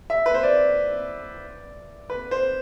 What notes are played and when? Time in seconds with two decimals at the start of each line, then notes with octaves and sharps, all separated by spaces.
0.10 E5
0.26 B4
0.34 C5
0.43 D5
2.10 B4
2.31 C5